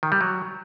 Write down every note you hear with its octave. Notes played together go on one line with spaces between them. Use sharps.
D#3
G3
F#3